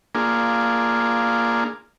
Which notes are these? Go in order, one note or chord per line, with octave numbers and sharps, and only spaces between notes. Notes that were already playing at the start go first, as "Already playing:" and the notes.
A#3 D4 F4 G#4